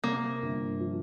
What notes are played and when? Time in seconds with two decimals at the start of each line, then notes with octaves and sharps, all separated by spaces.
0.04 C3 A#3
0.42 G1
0.80 F3